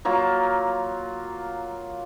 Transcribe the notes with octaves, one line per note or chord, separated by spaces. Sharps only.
F#3 A#3 F4